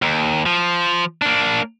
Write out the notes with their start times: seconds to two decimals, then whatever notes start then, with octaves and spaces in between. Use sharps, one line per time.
0.02 D#2
0.46 F3
1.22 A#3 D4